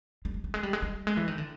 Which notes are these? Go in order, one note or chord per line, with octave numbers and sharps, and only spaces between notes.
G3
G#3
G3
G#3
G3
G#3
G3
G#3
E3
D#3
D3